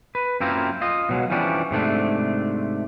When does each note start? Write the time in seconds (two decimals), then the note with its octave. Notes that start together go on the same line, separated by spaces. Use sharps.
0.15 B4
0.40 F#2 A#3 C4 E4 F4 A#5
0.81 F4 D#5
1.09 B2 F#3 G#3
1.30 E3 F3 G3 C#4 D4
1.71 G#2 C3 A3 D4